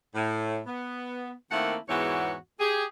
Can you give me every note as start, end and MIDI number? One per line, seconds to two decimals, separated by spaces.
0.15 0.60 45
0.66 1.31 59
1.51 1.76 51
1.51 1.76 57
1.51 1.76 58
1.51 1.76 60
1.51 1.76 64
1.51 1.76 78
1.88 2.35 40
1.88 2.35 44
1.88 2.35 52
1.88 2.35 59
1.88 2.35 66
1.88 2.35 73
2.60 2.84 67
2.60 2.84 68